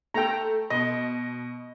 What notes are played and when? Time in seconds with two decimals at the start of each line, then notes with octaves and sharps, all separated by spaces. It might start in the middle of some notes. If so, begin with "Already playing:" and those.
0.14 A3 A4 G5 A#5
0.70 B2 D#5